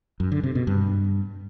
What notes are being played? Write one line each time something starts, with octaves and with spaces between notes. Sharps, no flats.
F#2
D3
C3
B2
G2